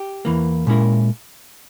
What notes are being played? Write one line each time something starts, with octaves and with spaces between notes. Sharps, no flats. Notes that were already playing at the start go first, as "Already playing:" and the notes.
Already playing: G4
E2 E3 A#3
A#2 G#3 C#4 E4 A#4